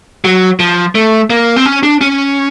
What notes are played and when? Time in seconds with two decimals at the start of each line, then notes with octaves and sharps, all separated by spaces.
0.25 F#3
0.60 F3
0.95 A3
1.30 A#3
1.56 C4
1.66 C#4
1.83 D4
2.01 C#4